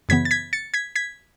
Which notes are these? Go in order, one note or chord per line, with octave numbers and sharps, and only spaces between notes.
F#2 C#3 E3 B3 G#6 B6
A6
G#6 B6
A6 C#7
G#6 B6
G#6 B6